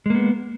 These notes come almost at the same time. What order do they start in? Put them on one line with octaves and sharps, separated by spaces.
G#3 A#3 B3